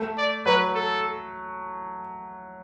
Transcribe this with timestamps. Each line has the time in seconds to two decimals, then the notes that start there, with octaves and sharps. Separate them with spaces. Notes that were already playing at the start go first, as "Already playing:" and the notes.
Already playing: A3
0.18 D5
0.46 F#3 B4
0.75 A4